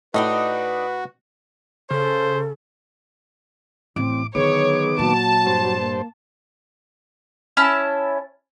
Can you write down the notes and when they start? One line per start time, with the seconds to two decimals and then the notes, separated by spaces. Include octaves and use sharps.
0.14 A2 D4 D#4 F#4 B4 D#5
1.90 C#3 A4 C5
3.96 A1 C4 D6
4.35 D3 D#3 F#3 B3 G#4 C#5 D6
4.99 A#2 F#3 A5
5.47 G2 C5
5.81 A#3
7.57 C#4 E4 A5